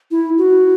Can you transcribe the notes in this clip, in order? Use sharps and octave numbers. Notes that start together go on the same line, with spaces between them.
E4
F#4